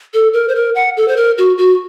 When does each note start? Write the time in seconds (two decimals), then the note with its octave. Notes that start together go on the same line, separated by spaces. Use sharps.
0.14 A4
0.33 A#4
0.48 C5
0.55 A#4
0.75 F#5
0.97 A4
1.08 C5
1.17 A#4
1.38 F#4
1.58 F#4